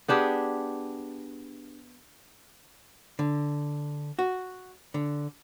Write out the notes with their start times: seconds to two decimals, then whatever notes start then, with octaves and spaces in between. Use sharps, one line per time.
0.08 B3 D4 G4 G#4
3.19 D3
4.19 F#4
4.94 D3